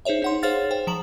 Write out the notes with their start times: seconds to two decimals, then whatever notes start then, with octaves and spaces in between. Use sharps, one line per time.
0.05 D#4 G#4 C5 C#5 E5
0.22 D#4 F#5 C6
0.43 G#4 C5 C#5 F5 F6 A6
0.71 C5 G5
0.87 F3 A#5 E7 F#7